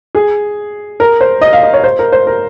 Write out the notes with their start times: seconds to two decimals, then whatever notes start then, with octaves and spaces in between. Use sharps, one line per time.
0.15 G#4
1.00 A#4
1.21 C5
1.41 D#5
1.53 F5
1.63 D#5
1.73 C#5
1.84 C5
1.99 A#4
2.12 C5
2.27 A#4